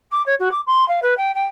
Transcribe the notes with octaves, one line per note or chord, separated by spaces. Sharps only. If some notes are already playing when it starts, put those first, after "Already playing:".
D6
C#5
F#4
D6
C6
F5
B4
G5
G5